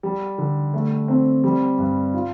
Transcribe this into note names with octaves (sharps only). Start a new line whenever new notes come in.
G3
D3
A3
C4
G3
G2
F4